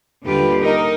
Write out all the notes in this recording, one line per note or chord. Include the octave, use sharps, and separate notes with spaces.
D#2 D3 G3 F4 G4 B4
D#4 A#4